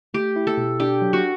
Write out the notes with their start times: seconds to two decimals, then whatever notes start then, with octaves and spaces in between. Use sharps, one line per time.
0.14 A3 G4
0.36 E4
0.47 A4
0.58 B2
0.80 D4 G4
1.02 F#3
1.13 F#4